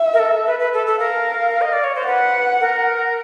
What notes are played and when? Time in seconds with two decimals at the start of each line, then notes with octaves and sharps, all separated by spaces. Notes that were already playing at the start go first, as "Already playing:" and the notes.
Already playing: E5
0.14 A#4
0.19 A4
0.46 B4
0.60 B4
0.73 A4
0.87 A4
0.99 A#4 F5
1.62 D#5
1.73 D5
1.84 C#5
1.95 C5
2.06 B4 F#5
2.60 A#4